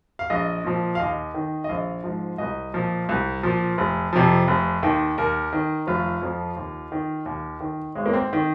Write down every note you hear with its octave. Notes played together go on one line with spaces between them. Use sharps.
F5
A#1 D#5
A#2 F3
F5
D#2 D#5
D#3
D#5
A#1 F5
G#2 F3
C2 D#5
A#2 F3
C2
A#2 F3
F1
F2 C3 F3
F1
D#2 D#3
D#2 A#4
D#3
F1 F4
F2 F3
D#2
D#3
D#2
D#3
G#1 G#3
A#3
C4
D#3